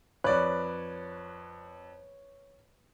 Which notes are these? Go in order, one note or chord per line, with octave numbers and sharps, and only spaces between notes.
F2 B4 C#5 D5 F#6